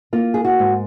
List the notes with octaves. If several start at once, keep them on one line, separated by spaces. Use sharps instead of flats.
A#3 F4
G#4
F#4
G#2